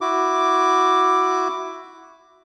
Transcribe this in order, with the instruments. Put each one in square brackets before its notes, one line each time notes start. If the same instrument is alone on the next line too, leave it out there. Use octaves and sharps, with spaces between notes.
[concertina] E4 F#4 D6